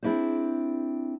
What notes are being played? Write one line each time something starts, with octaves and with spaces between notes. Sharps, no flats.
C4 D4 E4 G4 G#4 C5